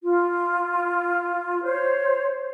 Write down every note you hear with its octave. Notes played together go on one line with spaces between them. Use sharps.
F4
C5 C#5